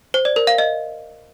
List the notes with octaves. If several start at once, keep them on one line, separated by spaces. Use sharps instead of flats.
C5
D5
A#4
F5
D#5